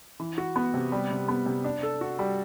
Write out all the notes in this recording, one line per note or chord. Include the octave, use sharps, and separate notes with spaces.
E3
F#4
B3
C3
G3
C3
B3
C3
D4
A4
F#4
G3